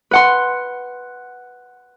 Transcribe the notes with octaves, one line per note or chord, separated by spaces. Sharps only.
B4 F#5 C6